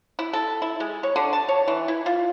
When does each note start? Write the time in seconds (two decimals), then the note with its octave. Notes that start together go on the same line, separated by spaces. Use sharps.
0.19 E4
0.33 A4
0.62 E4
0.80 G#3
1.03 C#5
1.16 D3
1.33 A5
1.48 C#5
1.68 E3
1.88 E4
2.06 F4